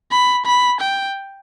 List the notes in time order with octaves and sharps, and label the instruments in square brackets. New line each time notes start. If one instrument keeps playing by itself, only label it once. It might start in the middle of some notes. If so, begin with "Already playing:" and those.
[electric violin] B5
B5
G5